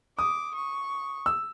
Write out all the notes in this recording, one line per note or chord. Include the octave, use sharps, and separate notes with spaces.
D6 D#6
C#6
E6